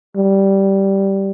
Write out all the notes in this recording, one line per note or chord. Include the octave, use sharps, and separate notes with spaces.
G3